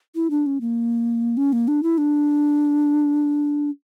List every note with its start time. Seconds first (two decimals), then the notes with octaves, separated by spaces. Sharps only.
0.15 E4
0.30 D4
0.46 C#4
0.61 A#3
1.37 C#4
1.53 A#3
1.68 D4
1.83 E4
1.98 D4